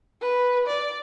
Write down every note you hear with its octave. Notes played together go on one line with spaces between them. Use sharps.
B4
D5